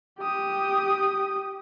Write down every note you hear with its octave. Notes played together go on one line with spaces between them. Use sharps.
G4 D#6